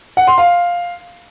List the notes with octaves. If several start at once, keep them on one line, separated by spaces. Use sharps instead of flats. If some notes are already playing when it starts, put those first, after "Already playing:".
F#5
C6
F5